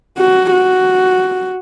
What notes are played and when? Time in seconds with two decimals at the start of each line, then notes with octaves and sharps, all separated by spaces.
0.18 F#4
0.52 F#4